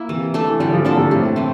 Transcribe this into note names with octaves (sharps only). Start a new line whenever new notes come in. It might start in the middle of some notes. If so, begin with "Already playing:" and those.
Already playing: A#3 E4
C3 E3
A3 D4 A4
E3
D3 G3
F3
D3 A#3 D4 A4
G2
A2 C3
E3 A3 C4